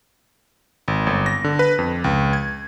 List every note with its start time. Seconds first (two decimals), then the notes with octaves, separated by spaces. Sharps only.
0.88 G#1
1.07 G1
1.26 A#6
1.44 D3
1.59 B4
1.79 F2
2.04 C#2
2.33 G#6